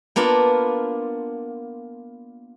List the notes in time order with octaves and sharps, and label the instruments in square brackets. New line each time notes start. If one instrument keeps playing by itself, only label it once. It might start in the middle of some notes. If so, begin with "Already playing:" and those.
[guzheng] A#3 B3 D4 F4